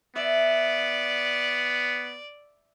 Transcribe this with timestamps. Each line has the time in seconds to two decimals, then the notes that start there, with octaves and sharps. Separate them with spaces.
0.16 B3 D5 E5